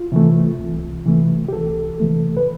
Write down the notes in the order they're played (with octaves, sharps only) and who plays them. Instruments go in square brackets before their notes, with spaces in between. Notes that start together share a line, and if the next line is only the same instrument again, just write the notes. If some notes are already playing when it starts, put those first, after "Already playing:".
Already playing: [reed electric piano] F4
C3 E3 A3
C2
C3 E3 A3
G4
C2 A4
C3 E3 A3
B4